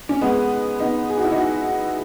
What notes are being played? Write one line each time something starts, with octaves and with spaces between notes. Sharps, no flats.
C#4
G#3 B3
B3 D#4
G#4
F#4
E4
D#4 F#4